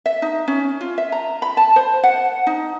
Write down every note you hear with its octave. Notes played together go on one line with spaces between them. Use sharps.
E5
D#4
C#4
F4
E5
A#5
B5
A5
C5
F#5
D#4